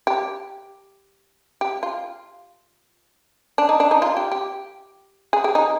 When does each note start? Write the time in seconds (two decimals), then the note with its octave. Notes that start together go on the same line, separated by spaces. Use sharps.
0.07 G4
1.61 G4
1.83 F4
3.58 D4
3.69 D#4
3.80 D4
3.91 D#4
4.02 F4
4.17 G4
4.32 G4
5.33 G#4
5.44 G4
5.55 D#4